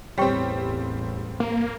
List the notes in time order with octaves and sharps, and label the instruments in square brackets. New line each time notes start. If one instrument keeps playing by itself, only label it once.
[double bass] A1 E2 [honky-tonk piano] G3 C4 [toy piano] C#5 G5 C#6
[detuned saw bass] A#3